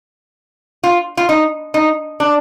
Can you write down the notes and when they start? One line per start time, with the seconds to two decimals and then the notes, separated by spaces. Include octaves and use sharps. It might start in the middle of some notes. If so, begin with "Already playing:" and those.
0.84 F4
1.17 F4
1.29 D#4
1.74 D#4
2.20 D4